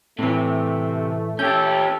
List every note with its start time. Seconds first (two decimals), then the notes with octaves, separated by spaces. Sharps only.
0.19 A2 C3 E3 A3
1.39 C#4 G4 A4 G6